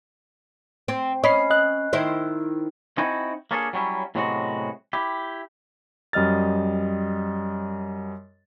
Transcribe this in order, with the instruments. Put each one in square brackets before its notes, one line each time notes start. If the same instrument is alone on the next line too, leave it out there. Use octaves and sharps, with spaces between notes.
[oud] C4
[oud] C#4 [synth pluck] D#5 B5 C7
[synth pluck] D#5 F#6
[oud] D#3 E4 C5
[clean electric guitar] C4 D#4 E4 F#4 G5 G#5
A#3 C#4 D4 G#4 A4
F#3 G3 C#4 E4
A2 C3 F#3 G#3 B3 F#4
E4 G4
[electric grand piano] F#2 G3 D#5 F6 A6